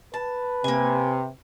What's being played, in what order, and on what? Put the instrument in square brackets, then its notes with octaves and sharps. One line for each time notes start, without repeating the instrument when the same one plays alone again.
[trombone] B4 [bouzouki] A5
[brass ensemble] C3 [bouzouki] A#3 G#5